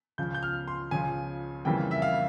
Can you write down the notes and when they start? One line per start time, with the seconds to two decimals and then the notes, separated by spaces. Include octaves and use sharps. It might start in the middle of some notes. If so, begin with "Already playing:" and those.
0.18 C#2 C#3 F3 G6
0.35 G6
0.43 F6
0.68 C6
0.91 C#2 C#3 F3 G#5
1.65 F2 C#3 E3 G3 A#3 G5
1.91 E5
2.02 F5